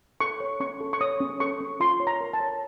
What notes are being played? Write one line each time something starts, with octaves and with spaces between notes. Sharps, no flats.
A4 C#6
C#5
C#4 C#6
A4
C#6
C#5 D#6
C#4
A4 C#6
C#4
F4 C6
C#5
A#5
A#4
A5
C#5